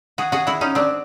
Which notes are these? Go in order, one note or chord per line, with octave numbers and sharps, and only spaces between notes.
F#4 G#4
F#4 G#4
E4 F#4
C#4 D#4
C4 D4